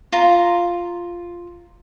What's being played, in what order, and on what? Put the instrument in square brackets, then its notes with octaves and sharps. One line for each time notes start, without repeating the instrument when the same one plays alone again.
[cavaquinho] F4 A#5